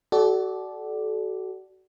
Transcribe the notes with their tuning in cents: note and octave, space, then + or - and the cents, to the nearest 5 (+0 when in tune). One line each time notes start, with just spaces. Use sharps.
F#4 +30 A4 -30 D5 +0